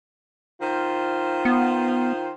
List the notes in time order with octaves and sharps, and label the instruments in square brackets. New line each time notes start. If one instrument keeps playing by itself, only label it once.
[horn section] D#3 F4 C5
[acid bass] B3